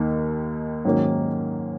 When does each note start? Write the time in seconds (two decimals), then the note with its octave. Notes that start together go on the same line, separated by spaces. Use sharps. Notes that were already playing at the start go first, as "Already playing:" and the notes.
Already playing: D#2 D#3 A#3 D#4
0.85 G#2 D#3 F#3 A#3 C#4